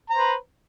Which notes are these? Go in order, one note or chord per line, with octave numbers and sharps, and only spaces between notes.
B4 C5 A#5